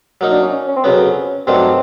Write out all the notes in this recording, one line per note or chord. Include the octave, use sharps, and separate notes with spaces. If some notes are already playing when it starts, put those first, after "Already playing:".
F#3 A#3 D#4
D4
C#4
C#4
C#4
C4
F2 C#3 F#3 B3 C#4
G2 D#3 F#3 A3 C4 D4